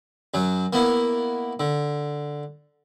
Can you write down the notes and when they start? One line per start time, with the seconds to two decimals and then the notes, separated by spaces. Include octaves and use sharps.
0.34 F#2 F#3
0.73 A#3 B3 E4
1.60 D3